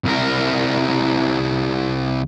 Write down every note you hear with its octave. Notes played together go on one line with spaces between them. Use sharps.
C2 A#4